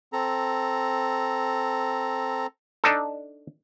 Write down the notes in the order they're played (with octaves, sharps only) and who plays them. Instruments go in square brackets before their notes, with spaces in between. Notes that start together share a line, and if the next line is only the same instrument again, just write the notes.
[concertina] C4 A4 A#5
[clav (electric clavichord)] D4 D#4 A4